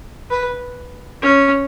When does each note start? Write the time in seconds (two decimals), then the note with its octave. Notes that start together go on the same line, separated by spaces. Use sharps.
0.30 B4
1.21 C#4